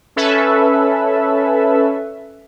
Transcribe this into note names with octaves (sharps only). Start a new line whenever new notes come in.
C#4 A4 B4 E5